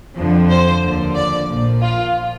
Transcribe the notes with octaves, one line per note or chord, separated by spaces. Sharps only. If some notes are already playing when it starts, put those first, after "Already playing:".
F2 D3 F3
C5
D#2 D3 F3
D5
A#1 A#2 F3
F4